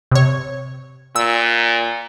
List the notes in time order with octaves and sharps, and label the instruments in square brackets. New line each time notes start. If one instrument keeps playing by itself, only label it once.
[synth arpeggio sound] C3 C#5
[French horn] A#2 [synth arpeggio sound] E6